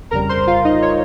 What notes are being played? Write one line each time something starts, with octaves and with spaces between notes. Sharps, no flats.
G1 F2 C#3 G3 A#4 A#5
C5 C6
F4 F5
D#4 D#5
C#5